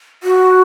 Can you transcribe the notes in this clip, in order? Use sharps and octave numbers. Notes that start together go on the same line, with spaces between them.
F#4